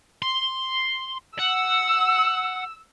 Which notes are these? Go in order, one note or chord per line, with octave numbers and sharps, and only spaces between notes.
C6
F#5 E6